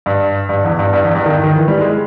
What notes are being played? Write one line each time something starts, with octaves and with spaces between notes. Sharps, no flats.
G2
G2
E2
G2
G2
E2
G2
D#3
D#3
E3
G3
G#3